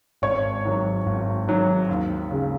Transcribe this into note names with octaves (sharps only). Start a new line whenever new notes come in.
G#1 C#5 C#6
G#2 D#3 F#3
G#1
G#2 D#3 F#3
D#2
C#3 G#3